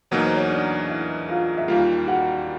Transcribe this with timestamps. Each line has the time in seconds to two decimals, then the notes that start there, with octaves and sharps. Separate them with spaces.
0.11 E2 B2 F#3 A#3 D#4 C#5
0.24 C5
0.36 C#5
0.50 D4 D5
0.89 E4 E5
1.29 F4 F5
1.58 E5
1.68 D#2 D#3 G3 A#3 F4 F5
2.07 F#4 F#5